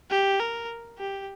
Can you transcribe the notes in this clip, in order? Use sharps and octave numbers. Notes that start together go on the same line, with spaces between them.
G4
A#4
G4